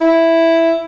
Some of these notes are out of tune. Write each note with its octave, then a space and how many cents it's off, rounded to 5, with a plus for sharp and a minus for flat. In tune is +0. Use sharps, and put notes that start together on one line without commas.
E4 +0